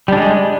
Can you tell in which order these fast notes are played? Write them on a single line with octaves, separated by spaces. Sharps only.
G3 D4 G#3